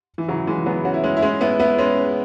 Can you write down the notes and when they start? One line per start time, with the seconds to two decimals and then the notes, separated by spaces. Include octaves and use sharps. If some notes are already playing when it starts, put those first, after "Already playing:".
0.18 E3
0.28 C#3 F#3
0.47 E3 G#3
0.66 F#3 B3
0.85 C#4 F#4
0.94 E4
1.04 G#3 C#4
1.17 E4
1.22 G#3 C#4
1.41 B3 E4
1.60 B3 E4
1.78 G#3 C#4